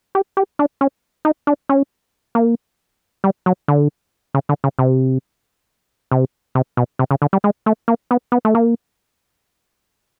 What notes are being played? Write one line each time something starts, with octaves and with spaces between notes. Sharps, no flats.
G4
G4
D4
C#4
D#4
D4
C#4
A#3
G3
F#3
D3
C#3
D3
C#3
C3
C3
C3
B2
C3
C#3
D3
G3
G#3
A3
A#3
B3
B3
A3
A#3